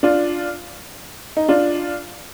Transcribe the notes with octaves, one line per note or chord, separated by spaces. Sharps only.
D4 F4
D#4
D4 F4